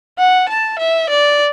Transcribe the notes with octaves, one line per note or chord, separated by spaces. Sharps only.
F#5
A5
E5
D5